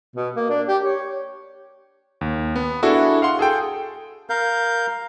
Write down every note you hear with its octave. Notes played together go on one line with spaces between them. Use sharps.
B2
A#3
D4
G4
C#5
D#2
B3
D4 E4 F#4 G#4 A4
F5 F#5 C6
G#4 A4 G5
A#4 F5 G6